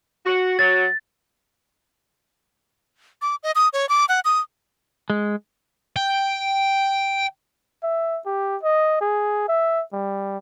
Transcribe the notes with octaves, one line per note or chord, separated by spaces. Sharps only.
F#4
F#3 A6
D6
D#5
D#6
C#5
D6
F#5
D#6
G#3
G5
E5
G4
D#5
G#4
E5
G3